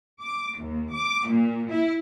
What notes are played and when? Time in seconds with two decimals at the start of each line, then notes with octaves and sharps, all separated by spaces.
0.20 D6
0.58 D#2
0.93 D6
1.27 A#2
1.70 E4